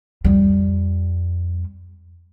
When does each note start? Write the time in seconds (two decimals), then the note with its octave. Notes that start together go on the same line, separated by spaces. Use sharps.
0.24 F2 G3